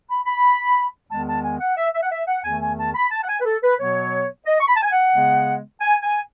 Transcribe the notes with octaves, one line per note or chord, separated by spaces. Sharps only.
B5
B5
E2 D#3 G#3 B3 A5
A5
G#5
F#5
E5
E5
F#5
E5
F#5
E2 D#3 A3 G#5
G#5
A5
B5
A5
F#5
G#5
B4
A4
B4
B2 F#3 B3 C#5
D#5
C#6
B5
A5
G#5
F#5
C#3 G#3 B3
G#5
G#5